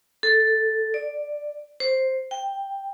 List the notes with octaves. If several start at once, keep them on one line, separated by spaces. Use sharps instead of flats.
A4
D5
C5
G5